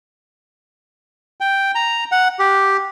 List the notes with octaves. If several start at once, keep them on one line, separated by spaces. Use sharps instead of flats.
G5
A#5
F#5
G4